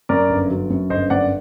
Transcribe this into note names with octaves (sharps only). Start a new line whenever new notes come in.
F#2 A#4 D5
G1
F#3
F#2
G1 C5 D#5
F#2 D5 F#5